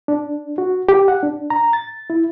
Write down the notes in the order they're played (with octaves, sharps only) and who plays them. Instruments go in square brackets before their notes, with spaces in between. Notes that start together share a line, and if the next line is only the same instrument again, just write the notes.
[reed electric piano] D4
F#4
G4
F#5
D4
A#5
A6
E4